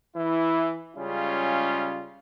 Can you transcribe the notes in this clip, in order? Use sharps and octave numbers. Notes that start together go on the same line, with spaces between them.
E3 E4
C#3 G3 G#3 C#4 F4